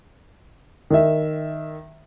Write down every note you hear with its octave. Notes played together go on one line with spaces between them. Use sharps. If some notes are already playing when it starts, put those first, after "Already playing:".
D#3 E5